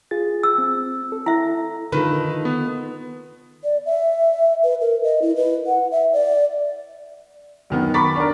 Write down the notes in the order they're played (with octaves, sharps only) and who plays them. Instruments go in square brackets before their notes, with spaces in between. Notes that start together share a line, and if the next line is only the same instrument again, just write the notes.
[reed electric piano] F4 G#4 A6
[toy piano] E6
[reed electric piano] C4
A4
[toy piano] E4 E5
[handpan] D3 F4 A4 [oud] D#3 [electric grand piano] B4
[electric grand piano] B3
[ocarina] D5
E5
B4
A#4
D#5
E4
B4
F#5
E5
D5
[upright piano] F#2 D#3 B3
A#5 B5 C#6 D6 A6 B6
D4 A#4